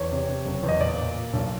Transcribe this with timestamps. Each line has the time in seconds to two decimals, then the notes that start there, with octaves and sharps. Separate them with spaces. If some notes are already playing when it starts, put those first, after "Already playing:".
Already playing: E2 C#5
0.12 C3
0.28 C3
0.46 F#1
0.63 E2
0.68 D#5
0.80 A#2 D5
0.99 A#2
1.15 A#2
1.33 B1